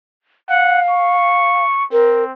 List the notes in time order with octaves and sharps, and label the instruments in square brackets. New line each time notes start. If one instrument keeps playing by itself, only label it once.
[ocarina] F5 [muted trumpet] F#5
[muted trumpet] C#6
[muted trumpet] C4 [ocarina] A#4